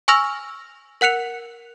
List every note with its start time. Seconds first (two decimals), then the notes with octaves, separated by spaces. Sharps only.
0.08 G#5 C#6 E6 F6 A#6 F7
1.01 A#4 F#5 F#6 C#7 F7